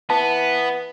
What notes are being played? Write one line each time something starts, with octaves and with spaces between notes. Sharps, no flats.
E3 B3 A5